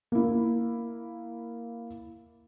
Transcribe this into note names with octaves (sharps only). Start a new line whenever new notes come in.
A#3 E4